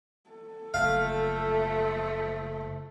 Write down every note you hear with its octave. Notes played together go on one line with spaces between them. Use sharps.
A4
F#1 F3 A3 F5